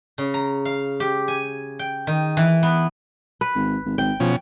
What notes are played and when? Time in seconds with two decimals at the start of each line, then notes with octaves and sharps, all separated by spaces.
0.18 C#3
0.34 A#5
0.65 F5
1.00 G4
1.28 G#5
1.79 G5
2.07 D#3
2.37 E3
2.63 B3
3.41 B4
3.55 G#1
3.86 G#1
3.98 G#1 G5
4.20 B2 F3 C#4